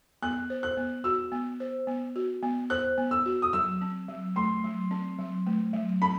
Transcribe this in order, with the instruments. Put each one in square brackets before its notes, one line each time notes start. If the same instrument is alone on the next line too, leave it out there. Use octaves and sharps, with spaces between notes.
[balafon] B3 [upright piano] F#6
[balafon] C5
[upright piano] F#6
[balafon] B3
[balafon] F#4 [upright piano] E6
[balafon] B3
C5
B3
F#4
B3
[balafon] C5 [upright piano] F#6
[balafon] B3
[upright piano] E6
[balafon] F#4
[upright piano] D#6
[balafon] F#3 [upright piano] E6
[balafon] C4
F#3
[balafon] A3 [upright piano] C6
[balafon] F#3
C4
F#3
A3
F#3
[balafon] C4 [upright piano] B5